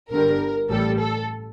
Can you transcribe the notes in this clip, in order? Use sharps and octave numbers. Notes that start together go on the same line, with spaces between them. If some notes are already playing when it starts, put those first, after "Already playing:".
G1 G2 D3 G3 A#4
A1 A2 G3 A4
A4